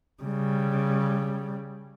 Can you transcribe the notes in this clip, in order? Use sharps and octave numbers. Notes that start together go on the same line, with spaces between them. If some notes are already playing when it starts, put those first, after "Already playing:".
C#3 G3